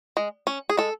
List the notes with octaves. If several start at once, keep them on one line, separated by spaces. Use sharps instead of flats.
G#3
C#4
G#4
G#3 A4